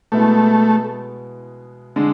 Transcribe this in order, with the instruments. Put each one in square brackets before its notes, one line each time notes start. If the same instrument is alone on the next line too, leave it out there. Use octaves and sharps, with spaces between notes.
[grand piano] B2 G#3 B3 E4 [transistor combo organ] A3
[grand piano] D3 G#3 D4